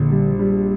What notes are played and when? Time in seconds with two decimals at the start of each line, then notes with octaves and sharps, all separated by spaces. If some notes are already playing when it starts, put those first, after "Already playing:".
Already playing: A#1 D3
0.10 G3
0.39 G3